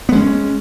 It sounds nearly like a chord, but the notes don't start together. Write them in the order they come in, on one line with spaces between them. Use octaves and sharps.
B3 G#3 C#4